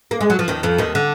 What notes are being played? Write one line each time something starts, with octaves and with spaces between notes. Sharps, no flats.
A#3
G#3
F#3
F3
D#2 D#3
F2 F3
D#2 D#3
D3